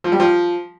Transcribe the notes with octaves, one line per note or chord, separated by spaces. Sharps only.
F3
G3
F3